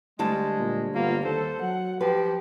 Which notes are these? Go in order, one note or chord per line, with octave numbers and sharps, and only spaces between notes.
D2 G3 G#3 A5
A#2
G1 A#3 B3 F4
D#2 A4 C5
F#3 F#5
F3 G4 B4